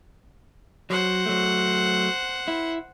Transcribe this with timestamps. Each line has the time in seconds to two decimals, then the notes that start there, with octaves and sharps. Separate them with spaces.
0.90 F#3 C5 F#5
1.26 F#3 A3
2.48 E4